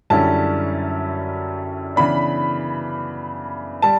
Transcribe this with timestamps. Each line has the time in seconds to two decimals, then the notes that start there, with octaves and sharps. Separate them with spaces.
0.10 F#2 D3 G3 C#4 E4 A5
1.96 C#3 E3 B3 D4 B5
3.82 G3 A5